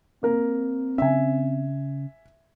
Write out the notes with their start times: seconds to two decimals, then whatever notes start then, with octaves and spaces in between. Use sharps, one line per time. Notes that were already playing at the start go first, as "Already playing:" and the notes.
0.23 A#3 C4 A#4
0.98 C#3 C#4 E5 G#5